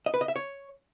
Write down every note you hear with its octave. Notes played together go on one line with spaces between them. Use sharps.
D#5
B4
D#5
E5
C#5